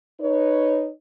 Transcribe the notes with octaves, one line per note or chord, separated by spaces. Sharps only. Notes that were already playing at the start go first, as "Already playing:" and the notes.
D#4 B4 C#5